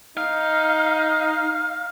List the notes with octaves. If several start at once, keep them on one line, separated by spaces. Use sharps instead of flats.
D#4 F5